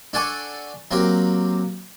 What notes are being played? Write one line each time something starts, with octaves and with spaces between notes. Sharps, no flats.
D4 A4 F#5 G#5 C#6 D6
F#3 A#3 C4 G4